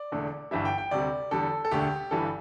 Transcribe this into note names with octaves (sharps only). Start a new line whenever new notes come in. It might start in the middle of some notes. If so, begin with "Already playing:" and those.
Already playing: D5
E1 E2 D3 A3
G1 G2 E3 G3 E5
G5
G5
D2 C3 G3 D5
E2 D3 G3 A4
A4
E1 D2 D3 A3 G4
G1 G2 E3 G3 A4